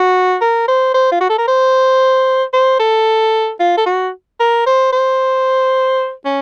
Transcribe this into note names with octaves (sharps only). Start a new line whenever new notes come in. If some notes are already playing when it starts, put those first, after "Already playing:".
Already playing: F#4
A#4
C5
C5
F4
F#4
A4
A#4
C5
C5
A4
F4
A4
F#4
A#4
C5
C5
C#4